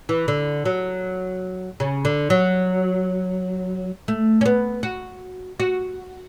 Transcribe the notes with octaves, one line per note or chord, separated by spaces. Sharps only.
E3
D3
F#3
C#3
D3
F#3
A3
C#4
B3
F#4
F#4